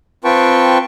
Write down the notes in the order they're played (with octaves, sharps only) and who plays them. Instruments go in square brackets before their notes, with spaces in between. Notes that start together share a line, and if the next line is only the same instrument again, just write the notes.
[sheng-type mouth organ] C4 F4 B4 G5 A5 C#6